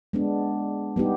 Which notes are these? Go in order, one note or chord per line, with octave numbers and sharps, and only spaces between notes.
G#3 B3 D4
G3 B3 D#4 G4